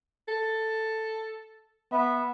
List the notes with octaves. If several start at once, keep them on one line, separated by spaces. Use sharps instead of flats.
A4
B3 E5